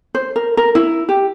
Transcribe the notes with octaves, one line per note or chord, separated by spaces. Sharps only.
C5
A#4
A#4
E4
G4